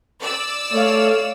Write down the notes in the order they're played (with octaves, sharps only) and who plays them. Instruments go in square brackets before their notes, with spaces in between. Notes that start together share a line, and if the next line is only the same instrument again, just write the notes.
[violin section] D5 E6
[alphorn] A3 [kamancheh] C#5 F5